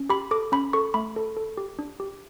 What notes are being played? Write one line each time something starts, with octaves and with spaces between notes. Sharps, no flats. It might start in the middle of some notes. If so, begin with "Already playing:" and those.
Already playing: C#4
G4 B5
A4 D6
C#4 B5
A4 C#6
A3 B5
A4
A4
G4
D4
G4